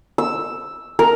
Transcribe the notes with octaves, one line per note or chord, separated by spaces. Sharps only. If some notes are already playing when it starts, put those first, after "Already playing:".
E6
A#4